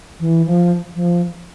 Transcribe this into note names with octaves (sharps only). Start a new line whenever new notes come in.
E3
F3
F3